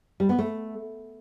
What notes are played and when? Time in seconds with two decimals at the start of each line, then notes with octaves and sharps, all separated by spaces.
0.20 G3
0.29 B3
0.38 A3